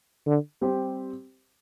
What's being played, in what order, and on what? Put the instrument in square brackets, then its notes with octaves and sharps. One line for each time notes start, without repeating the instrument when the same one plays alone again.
[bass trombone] D3
[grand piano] G3 C4 G4 C5